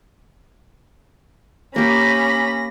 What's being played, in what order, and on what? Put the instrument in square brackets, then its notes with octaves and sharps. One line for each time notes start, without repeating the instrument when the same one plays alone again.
[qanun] A#3 G4 [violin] C#4 B5 [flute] A#6